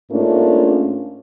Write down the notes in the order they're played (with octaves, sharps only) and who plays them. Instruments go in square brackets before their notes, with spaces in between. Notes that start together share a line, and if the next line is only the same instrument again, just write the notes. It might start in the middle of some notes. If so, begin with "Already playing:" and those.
[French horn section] G#2 A3 A#3 C#4 D4 F4